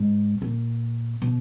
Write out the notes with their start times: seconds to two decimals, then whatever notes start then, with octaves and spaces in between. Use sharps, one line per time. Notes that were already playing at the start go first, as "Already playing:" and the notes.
Already playing: G#2
0.42 A#2
1.22 B2